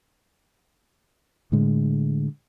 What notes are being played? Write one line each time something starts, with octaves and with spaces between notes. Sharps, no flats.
A2 D3 G#3